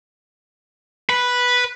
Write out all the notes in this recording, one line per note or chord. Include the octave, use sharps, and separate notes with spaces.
B4